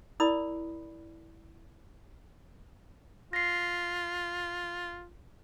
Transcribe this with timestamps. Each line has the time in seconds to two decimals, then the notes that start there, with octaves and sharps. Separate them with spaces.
0.20 E4 A#4 D5 B5 D#6
3.33 F4 A#6 C7